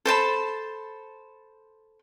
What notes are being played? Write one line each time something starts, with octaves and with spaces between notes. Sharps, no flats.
A4 C5 A5 B5